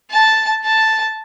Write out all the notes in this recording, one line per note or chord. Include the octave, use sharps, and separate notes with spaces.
A5
A5